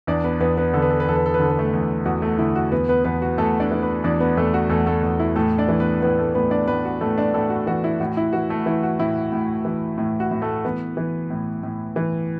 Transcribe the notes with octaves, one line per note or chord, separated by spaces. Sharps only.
E2 D4 D5
B3 B4
E2 B3 B4
B3 B4
D3 A4
B4
A4
B4
E2 A4
B4
A4
B4
D3 A4
B4
A3 A4
E2
E2 F#4
A3 A4
D3 E4
F#4
E2 B3 B4
B3 B4
E2 B3 B4
F#4
E2 A3 A4
D4 D5
E3
B3 B4
E2 D4 D5
B3 B4
E2 A3 A4
F#4
E2 A3 A4
A3 A4
E2
E4
A2 A3 A4
D4 D5
E3
B3 B4
A2 B3 B4
A3 A4
A2 B3 B4
D4 D5
A2 B3 B4
F#4
A2 A3 A4
D4 D5
A2 A3 A4
F#4
E3 F#4
E4
A2 F#4
E4
E3 F#4
A3 A4
E3 E4
F#4
A2 E4
A2
E3
A2
F#4
A2
A3 A4
E3 B3 B4
E3
A2
A2
E3